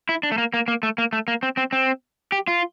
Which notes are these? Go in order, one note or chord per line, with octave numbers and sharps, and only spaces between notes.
E4
D4
A3
A#3
A#3
A#3
A3
A#3
A3
A#3
C4
C4
C4
G4
F4